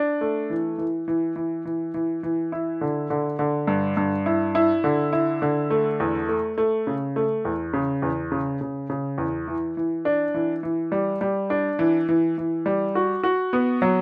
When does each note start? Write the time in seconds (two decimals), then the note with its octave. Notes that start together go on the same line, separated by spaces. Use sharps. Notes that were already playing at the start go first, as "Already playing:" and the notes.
Already playing: D4
0.21 A3
0.50 E3
0.78 E3
1.08 E3
1.36 E3
1.65 E3
1.94 E3
2.23 E3
2.52 E4
2.81 D3
3.10 D3
3.39 D3
3.68 G2
3.97 G2
4.26 E4
4.55 E4
4.84 D3
5.13 E4
5.42 D3
5.70 A3
6.00 E2
6.29 A3
6.58 A3
6.87 C#3
7.16 A3
7.45 E2
7.73 C#3
8.02 E2
8.32 C#3
8.61 C#3
8.90 C#3
9.18 E2
9.48 E3
9.77 E3
10.05 D4
10.34 E3
10.63 E3
10.92 G3
11.21 G3
11.50 D4
11.79 E3
12.09 E3
12.38 E3
12.66 G3
12.95 F#4
13.23 F#4
13.53 B3
13.82 F#3